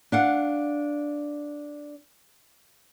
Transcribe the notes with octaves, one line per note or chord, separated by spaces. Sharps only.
D4 F5 F#5